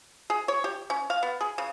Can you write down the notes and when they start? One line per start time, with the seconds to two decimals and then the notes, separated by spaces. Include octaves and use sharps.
0.30 G#4
0.48 C#5
0.64 G4
0.90 C#4
1.10 F5
1.23 B3
1.41 G#4
1.58 C#3